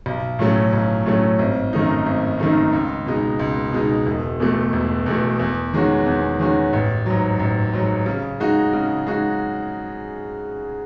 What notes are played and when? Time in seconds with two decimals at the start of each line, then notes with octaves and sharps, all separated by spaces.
0.06 B1
0.39 A2 F#3 A3 C#4
0.73 B1
1.06 A2 F#3 A3 C#4
1.39 G#1
1.73 F#2 D#3 A3 D#4
2.06 G#1
2.40 F#2 D#3 A3 D#4
2.73 C#2
3.06 B2 G#3 D#4
3.39 C#2
3.73 B2 G#3 D#4
4.07 E1
4.40 E2 B2 A3
4.73 E1
5.06 E2 B2 A3
5.39 E2
5.74 D#3 G#3 C#4 F#4
6.06 E2
6.39 D#3 G#3 C#4 F#4
6.73 A1
7.06 G#2 F#3
7.40 A1
7.73 G#2 F#3
8.06 C#3
8.40 G#3 D#4 F#4
8.73 C#3
9.07 G#3 D#4 F#4